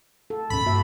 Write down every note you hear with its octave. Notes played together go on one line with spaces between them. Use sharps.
A4
A1 D#2 C#4 B5
G2 A#3 F#4 E5